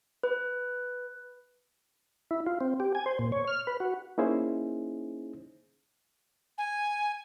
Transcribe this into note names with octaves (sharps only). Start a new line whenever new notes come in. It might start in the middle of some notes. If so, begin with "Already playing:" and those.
B4
E4
F4
C4
G4
G#5
C5
A#2
C#5
F6
B4
F#4
A#3 C#4 D#4 E4 G#4 C5
G#5